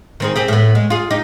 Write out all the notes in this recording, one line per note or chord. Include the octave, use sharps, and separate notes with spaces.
D#3 C4 G#4
C4 G4 G#4
A2 B3
G#3
F4 G#4
D#4 G4